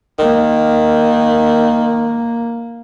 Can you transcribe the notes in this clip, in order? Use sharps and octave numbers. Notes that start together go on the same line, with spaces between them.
D#3 A#3